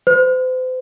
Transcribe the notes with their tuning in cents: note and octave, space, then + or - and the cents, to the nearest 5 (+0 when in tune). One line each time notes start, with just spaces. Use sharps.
C5 -40